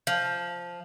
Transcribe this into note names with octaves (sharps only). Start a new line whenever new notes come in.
F3